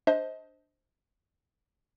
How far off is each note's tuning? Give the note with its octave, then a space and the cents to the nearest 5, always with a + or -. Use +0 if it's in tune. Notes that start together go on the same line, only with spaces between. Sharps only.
D4 +0 C5 +0 D#5 +30